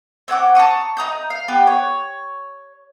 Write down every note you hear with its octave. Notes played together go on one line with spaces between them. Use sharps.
C4 C#4 F#5 D6
A5 A#5 C#6 D#6
D#4 A#5 D#6 G6
F5
B3 G4 B4
C#5